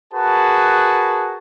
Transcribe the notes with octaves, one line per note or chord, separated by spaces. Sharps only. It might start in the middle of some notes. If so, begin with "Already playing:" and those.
F#4 G#4 A#4 B4 A5